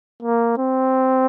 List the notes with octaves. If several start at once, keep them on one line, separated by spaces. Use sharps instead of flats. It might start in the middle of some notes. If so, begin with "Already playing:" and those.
A#3
C4